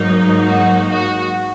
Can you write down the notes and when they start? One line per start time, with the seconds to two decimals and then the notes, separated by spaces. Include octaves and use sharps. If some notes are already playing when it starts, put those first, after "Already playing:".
Already playing: G#2 F#3 A#3 D#4
0.44 F#4
0.91 F#4